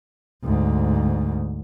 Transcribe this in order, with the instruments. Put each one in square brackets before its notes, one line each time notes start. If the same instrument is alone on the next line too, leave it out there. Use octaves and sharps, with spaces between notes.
[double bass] D2 G#2